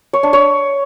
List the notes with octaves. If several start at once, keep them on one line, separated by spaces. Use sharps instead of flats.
C#5
D4
C#5